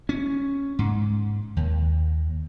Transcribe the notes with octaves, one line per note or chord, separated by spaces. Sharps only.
C#4
G#2
D#2